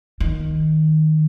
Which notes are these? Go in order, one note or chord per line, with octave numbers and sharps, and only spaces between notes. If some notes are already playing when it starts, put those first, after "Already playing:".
D#3